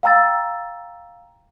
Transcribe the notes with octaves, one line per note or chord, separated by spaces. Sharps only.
F5 G5 A#5 E6 A6